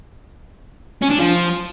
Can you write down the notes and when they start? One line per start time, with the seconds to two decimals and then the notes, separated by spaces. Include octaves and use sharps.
1.02 C#4
1.10 D4
1.19 F3